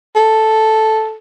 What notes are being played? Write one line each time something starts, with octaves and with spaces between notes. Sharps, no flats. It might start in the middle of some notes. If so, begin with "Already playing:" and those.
A4